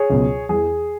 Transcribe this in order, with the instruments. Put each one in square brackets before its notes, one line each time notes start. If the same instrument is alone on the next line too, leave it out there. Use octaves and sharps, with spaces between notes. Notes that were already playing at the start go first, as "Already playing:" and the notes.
Already playing: [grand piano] G#4 C#5
C#2 B2 F#3
E2 E3 G#4